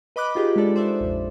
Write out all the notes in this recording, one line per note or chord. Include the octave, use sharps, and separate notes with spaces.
B4 D#5 B5 D6 F#6
D#4 F4 G4 G#4 B4 D#5
G#3 D4 A4 D5
C5 D5 E5
A#1 F2